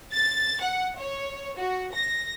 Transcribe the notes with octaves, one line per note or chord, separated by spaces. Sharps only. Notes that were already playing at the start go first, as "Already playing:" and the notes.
A6
F#5
C#5
F#4
A#6